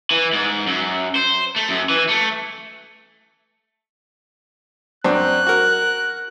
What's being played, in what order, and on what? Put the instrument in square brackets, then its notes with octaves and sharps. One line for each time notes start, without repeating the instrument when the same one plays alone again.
[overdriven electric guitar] E3
G#2
F#2
C5
A3
F#2
E3
A3
[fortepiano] F#2 C4 D4 [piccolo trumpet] F#6
[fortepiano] F#4 A#4